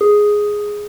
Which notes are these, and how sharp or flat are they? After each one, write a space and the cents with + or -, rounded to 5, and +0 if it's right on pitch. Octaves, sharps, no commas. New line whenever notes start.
G#4 +0